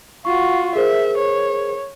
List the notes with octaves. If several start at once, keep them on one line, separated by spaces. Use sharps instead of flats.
F4 F#4 C#6
G#4 A#4 C5 E5
C#5